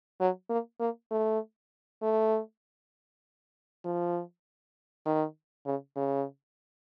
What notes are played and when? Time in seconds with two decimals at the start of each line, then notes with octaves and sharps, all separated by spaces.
0.20 F#3
0.50 A#3
0.80 A#3
1.11 A3
2.02 A3
3.84 F3
5.06 D#3
5.66 C#3
5.96 C#3